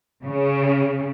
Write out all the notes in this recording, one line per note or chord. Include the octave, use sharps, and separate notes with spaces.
C#3